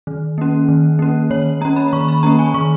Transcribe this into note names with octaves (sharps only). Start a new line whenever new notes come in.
D#3
A#3 C#4
D#3
A#3 C#4
D#3 C#5
A#3 C#4 A#5
B5
D#3 C#6
B5
A#3 C#4 A#5
G#5
D#3 C#6